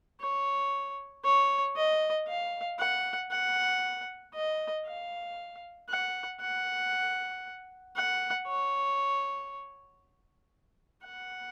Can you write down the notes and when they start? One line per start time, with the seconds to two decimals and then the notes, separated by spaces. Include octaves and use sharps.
0.21 C#5
1.24 C#5
1.76 D#5
2.28 F5
2.79 F#5
3.31 F#5
4.34 D#5
4.86 F5
5.89 F#5
6.41 F#5
7.96 F#5
8.48 C#5
11.06 F#5